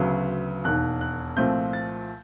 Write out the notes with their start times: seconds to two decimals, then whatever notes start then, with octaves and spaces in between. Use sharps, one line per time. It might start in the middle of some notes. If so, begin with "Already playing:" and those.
Already playing: D2 C#3 F#3 B3
0.64 E1 D#2 D#3 F#6
1.01 F#6
1.37 C2 A#2 F3 A3 C4 G6
1.73 A6